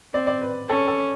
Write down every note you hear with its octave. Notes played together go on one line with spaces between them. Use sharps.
C4 D5
D5
B4
C#4 A4
A4